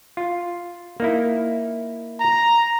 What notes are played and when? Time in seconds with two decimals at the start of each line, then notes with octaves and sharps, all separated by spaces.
0.17 F4
1.00 A#3 D#4 E4
2.20 A#5